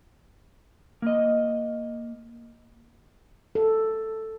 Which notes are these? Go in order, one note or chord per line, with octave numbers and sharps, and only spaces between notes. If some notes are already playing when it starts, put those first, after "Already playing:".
A#3 D#5
A4